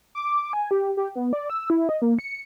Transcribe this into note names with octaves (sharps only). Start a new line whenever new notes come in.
D6
G#5
G4
G4
B3
D5
E6
E4
D#5
A#3
C#7